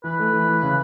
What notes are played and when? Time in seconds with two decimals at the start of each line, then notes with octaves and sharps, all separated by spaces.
0.04 E3 B4
0.19 A3
0.33 E3
0.48 E3
0.63 C#3